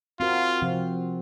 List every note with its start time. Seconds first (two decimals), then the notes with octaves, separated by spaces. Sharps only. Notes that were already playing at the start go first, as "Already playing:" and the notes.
0.20 C4 F4 F#4 A#4
0.62 C3 F3 C4